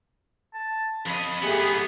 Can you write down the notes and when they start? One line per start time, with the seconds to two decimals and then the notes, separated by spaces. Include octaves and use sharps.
0.54 A5
1.06 F2 D#5 B5
1.43 G#2 A3 B3 G4 G#4